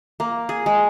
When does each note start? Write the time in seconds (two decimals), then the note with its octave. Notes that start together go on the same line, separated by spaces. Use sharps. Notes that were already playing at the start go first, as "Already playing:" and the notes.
0.20 A#3
0.49 G#4
0.66 G#3